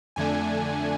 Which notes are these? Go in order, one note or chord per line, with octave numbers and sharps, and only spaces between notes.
F2 D3 A3 D4 G#5